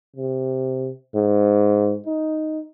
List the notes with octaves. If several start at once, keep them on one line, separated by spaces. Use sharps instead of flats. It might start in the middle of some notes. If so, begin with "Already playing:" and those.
C3
G#2
D#4